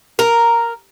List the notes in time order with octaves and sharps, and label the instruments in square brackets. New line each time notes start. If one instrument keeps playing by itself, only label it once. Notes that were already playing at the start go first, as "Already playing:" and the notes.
[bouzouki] A#4